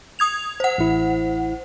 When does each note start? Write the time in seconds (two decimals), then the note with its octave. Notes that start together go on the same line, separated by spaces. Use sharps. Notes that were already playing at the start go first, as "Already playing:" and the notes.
0.19 D#6 G#6 F7
0.60 C5 F#5
0.78 A1 E4